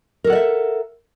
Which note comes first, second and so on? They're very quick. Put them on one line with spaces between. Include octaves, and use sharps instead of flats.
A#4 A4 F#5 D5 E5